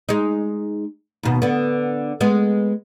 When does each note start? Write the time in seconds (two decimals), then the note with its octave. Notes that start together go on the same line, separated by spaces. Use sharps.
0.09 G#3 D#4
1.23 D#2 B2
1.42 D3 B3
2.21 G#3 B3